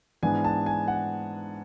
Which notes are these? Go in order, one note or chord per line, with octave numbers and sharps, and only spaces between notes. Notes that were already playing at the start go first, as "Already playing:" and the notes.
G#2 E3 B3 D4 G#5
A5
G#5
F#5